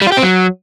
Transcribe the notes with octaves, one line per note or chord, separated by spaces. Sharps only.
G3
F4
G4
C4
F#3